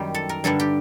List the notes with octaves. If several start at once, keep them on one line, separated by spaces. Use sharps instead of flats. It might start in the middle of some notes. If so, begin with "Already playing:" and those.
Already playing: F#2 D#3 G3 G4
A4
A#4
G2 D3 G3 A4
G4